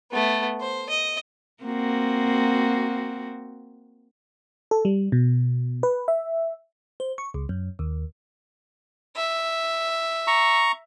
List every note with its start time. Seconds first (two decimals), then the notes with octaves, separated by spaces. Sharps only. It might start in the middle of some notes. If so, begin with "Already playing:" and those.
0.12 A3 B3
0.60 C5
0.90 D#5
1.64 A#3 C4 F#4
4.71 A4
4.85 G3
5.12 B2
5.83 B4
6.08 E5
7.00 C5
7.18 C#6
7.34 C#2
7.49 F#2
7.79 D#2
9.16 E5
10.27 A#5 C#6